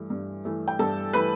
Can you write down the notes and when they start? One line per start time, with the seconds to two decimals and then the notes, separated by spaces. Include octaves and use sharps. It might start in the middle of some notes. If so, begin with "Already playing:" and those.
Already playing: G2 E3 A3
0.10 G2
0.45 E3 A3
0.68 G5
0.79 G2 A4 A5
1.13 E3 A3 B4 B5